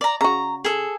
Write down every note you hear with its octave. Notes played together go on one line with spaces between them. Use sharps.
D5 A#5
C#3 F#4 A#5
G#4 A4